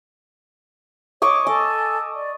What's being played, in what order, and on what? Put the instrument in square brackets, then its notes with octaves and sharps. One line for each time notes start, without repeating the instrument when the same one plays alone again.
[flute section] C#5 [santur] D#5 C#6 D6
[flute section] A4 G#5 [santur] D#5
[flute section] D5